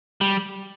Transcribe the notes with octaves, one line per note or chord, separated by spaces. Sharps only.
G3